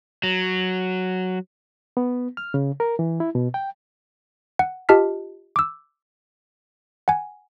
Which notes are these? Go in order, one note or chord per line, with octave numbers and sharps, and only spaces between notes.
F#3
B3
F6
C#3
A#4
E3
E4
B2
G5
F#5
F4 G4 D#5 A5 F6 B6
D6 E6
F#5 G#5